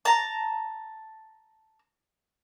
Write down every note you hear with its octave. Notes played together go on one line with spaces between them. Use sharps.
A5 A#5